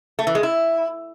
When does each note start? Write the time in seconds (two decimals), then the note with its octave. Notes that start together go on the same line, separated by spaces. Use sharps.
0.19 A3
0.27 E3
0.35 G#3
0.43 E4